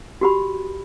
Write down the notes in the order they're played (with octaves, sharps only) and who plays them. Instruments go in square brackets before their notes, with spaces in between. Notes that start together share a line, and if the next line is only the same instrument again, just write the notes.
[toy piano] F#4 G4 B5